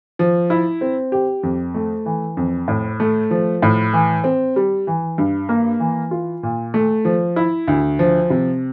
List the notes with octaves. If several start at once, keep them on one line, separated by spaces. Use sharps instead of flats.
F3
E4
C4
G4
F2
A3
E3
F2
A2
A3
F3
A2
E3
C4
G3
E3
G2
A#3
E3
F4
A#2
A3
F3
E4
D2
F3
C3